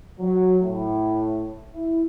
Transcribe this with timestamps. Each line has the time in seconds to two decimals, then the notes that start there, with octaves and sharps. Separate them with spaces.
0.20 F#3
0.62 A2
1.72 E4